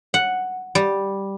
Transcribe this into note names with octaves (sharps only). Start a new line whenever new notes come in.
F#5
G3